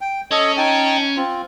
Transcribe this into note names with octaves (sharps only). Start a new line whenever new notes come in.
G5
C#4 A4 D#5
D#4 G5 A5
C4 F4